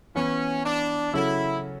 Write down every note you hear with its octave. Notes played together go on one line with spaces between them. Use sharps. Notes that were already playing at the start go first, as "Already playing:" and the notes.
E3 B3 C#4 E4
D4
C#3 F#3 C#4 E4 F#4 A4